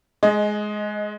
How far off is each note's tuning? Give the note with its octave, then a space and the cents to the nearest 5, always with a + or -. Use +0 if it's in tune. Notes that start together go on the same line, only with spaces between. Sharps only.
G#3 +15 D#5 +0